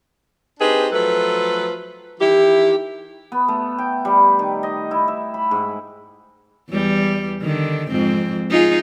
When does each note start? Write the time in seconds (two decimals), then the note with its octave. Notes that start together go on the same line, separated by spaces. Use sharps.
0.60 C4 D4 D#4 G4 G#4 B4
0.92 F3 F#3 A3 A4 B4
2.20 D#3 E3 E4 G4
3.32 B3
3.48 A3
3.78 G5
4.05 G3
4.39 D#3
4.63 D#5
4.91 E4
5.08 E5
5.34 B5
5.51 G#2
6.70 E2 G3
7.42 D3 D#3
7.90 F2 G#2 C4
8.50 D#4 F4 G#4